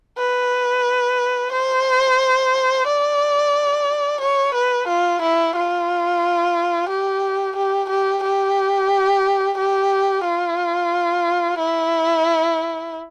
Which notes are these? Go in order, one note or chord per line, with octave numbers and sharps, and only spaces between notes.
B4
C5
D5
C#5
B4
F4
E4
F4
G4
G4
G4
G4
G4
F4
E4